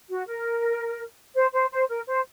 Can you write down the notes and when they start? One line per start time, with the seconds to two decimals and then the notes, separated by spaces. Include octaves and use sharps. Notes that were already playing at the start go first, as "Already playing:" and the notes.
0.10 F#4
0.28 A#4
1.35 C5
1.53 C5
1.71 C5
1.89 A#4
2.07 C5